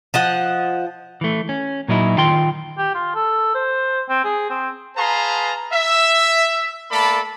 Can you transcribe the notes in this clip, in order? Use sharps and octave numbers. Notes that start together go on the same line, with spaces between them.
F3 D#5 F#5
E3 A3
C#4
A#2 F#3 D#4 E4
D#3 F4 G5 C6
G4
F4
A4
C5
C4
G#4
C4
G#4 B4 F5 A5 A#5 C6
E5
A3 A#3 A4 D5 B5